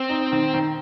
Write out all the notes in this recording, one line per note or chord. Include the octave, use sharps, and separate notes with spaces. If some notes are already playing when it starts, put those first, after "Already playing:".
Already playing: C4
D#4
D#3
D#3